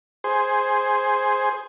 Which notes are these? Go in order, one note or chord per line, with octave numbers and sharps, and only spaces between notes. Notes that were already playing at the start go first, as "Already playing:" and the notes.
G#4 C5